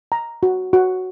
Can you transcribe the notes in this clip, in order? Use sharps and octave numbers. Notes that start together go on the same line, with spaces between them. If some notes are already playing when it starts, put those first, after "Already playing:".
A#5
F#4
F#4